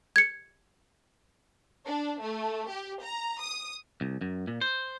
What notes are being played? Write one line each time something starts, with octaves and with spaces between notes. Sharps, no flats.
G#6 C#7
D4
A3
G4
A#5
D#6
C2
F#2
A#2
C5